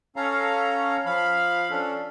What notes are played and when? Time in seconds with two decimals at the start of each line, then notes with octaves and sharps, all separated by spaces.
0.16 C#4 A4 C#5 F5 A#5
1.06 F3 F5 B5
1.71 C#4 D4 A4